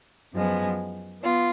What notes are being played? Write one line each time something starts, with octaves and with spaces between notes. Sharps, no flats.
F#2 F3 G#3 B3
B3 F4